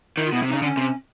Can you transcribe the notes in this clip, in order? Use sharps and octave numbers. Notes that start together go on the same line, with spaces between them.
D#3 E4
F4
B2 E4
C3
C#3 D#4
D3 C#4
C3